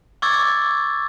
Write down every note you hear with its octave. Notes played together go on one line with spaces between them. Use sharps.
C#6 D6 E6 G#6 A6